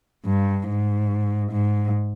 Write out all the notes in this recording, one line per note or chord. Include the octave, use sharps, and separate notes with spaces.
G2
G#2
G#2